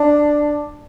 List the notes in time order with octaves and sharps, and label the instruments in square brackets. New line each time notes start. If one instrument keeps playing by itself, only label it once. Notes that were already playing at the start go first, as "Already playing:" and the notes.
Already playing: [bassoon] D4